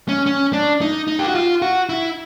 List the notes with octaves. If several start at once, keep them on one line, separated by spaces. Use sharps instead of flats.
C#4
C#4
D4
D#4
D#4
G4
F#4
F4
F#4
E4